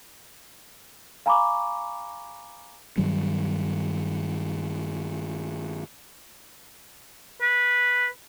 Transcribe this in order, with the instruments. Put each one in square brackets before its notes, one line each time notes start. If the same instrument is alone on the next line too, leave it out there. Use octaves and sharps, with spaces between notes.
[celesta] F5 G#5 A#5 B5 C#6 D6
[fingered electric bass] G2 D#3 F#3 G3
[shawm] B4